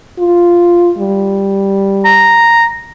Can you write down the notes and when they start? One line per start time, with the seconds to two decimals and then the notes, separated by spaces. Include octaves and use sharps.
0.19 F4
0.98 G3
2.05 A#5